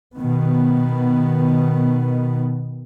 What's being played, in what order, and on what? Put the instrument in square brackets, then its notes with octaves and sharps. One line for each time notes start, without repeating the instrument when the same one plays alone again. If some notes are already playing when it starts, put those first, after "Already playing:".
[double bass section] B2 D#3 B3